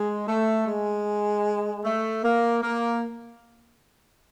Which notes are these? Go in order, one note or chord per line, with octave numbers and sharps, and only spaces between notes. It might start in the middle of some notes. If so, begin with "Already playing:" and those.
Already playing: G#3
A3
G#3
A3
A#3
A#3